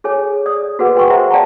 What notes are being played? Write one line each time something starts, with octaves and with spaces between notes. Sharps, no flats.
G#4 A4 C#5 G#5
D5 D#6
F#4 G#4 A4 B4 F#5
F#4 B4 G5 G#5 C6 C#6
A#4 C5 E5 F#5 A#5
D5 F5 G5 A5 A#5 C#6